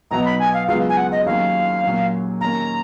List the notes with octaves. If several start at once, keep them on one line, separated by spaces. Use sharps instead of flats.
B1 B2 F#3 B3 D#4 A#5
B5
G#5
F5
C#2 C#3 F#3 B3 F4 F5
G#5
F#5
D#5
D#2 D#3 F#3 C#4 F5
A#2 F#3 C#4
D#2 D#3 A#3 C#4 A#5